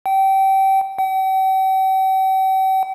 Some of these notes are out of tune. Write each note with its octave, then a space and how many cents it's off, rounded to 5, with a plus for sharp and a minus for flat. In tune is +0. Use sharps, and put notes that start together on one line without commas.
G5 -25
G5 -45